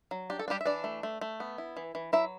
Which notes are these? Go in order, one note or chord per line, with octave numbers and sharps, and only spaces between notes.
F#3
D4 G4
A4
G3 D4 G4
E5
E3 D4 D5
A3
A3
A3
B3
E4
E3
E3
F#3 E4 E5